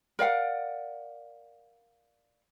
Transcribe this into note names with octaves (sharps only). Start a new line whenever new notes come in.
A#4 D5 F5 F#5